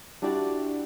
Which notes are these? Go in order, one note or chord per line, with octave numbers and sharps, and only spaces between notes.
G3 D4 E4 F#4 G4 D5